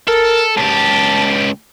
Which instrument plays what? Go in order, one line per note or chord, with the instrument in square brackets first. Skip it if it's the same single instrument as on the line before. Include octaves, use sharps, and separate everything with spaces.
[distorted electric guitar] A4 [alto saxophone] A#4
[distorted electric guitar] C#2 G4 [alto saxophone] A5